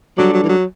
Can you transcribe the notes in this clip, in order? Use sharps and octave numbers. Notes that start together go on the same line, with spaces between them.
F#3 G3 D4 A4 D5
F#3
E3
F#3